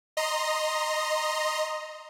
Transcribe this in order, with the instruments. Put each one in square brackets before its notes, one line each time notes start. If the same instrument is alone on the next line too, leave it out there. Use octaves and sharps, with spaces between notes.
[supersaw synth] D#5 A#5 C6